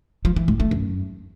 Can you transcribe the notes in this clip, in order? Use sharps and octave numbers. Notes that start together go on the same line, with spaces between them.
F3
E3
A2
A3
F#2